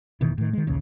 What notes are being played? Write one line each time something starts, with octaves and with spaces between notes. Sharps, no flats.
F1 B2 D#3 E3
A2 D#3
D#3 G#3
A#1 D#2 C#3